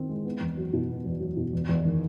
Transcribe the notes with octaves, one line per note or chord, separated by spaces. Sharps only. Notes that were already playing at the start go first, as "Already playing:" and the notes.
Already playing: D#3 C4
G#3
B3
E2
F#3
B2
B3
E2
F#3
B2
E2
E2
D#3